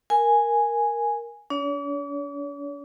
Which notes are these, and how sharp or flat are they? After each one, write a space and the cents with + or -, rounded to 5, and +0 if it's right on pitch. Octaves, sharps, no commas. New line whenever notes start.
A#4 +0 G#5 +0
D4 -40 C#5 +40